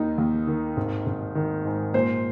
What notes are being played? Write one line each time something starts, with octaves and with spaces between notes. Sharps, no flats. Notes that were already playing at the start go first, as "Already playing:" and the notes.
Already playing: D#2 D#3 D#4
D#2
D#3
G#1
G#1
D#3
G#2
A#2 C5